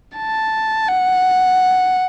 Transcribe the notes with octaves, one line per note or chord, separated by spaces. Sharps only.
A5
F#5